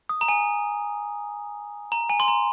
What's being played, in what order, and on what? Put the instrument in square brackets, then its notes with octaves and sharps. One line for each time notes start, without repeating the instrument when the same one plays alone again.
[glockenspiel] D#6
A#5
G#5
A#5
G#5
C6
A#5